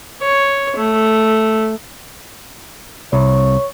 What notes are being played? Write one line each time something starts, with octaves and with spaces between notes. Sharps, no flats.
C#5
A3
C2 C#5